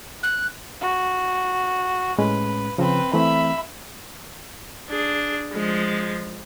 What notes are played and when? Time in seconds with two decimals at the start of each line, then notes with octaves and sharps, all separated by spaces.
0.23 F#6
0.81 F#4
2.18 A2 G#3 C#4 B4
2.78 C#3 F3 C4 B4
3.13 E3 A3 C4 E5 B5
4.90 D4 G#4
5.53 F3 G#3